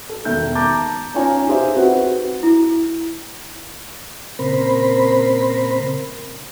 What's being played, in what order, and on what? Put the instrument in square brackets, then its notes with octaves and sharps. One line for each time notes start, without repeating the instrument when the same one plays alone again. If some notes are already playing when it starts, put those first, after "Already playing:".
[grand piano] A4
E1 D#3 E5 G6
A5 A#5 D6 G6 A6
C#4 D#4 F4 C#5 G#5 A#5
D#4 F4 G4 G#4 C5 E5
C4 F#4 B4
[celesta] E4
[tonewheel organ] A#2 C#3 C4 A#4 C5 B5